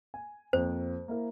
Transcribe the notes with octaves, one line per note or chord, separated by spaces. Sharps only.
G#5
F2 A#3 C5
A#3 E4 A#4